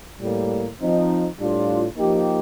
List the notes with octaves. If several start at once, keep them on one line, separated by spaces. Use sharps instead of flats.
A2 G3 A#3
F3 C4 D#4
A2 G3 D4 F4
F3 A#3 D#4 G4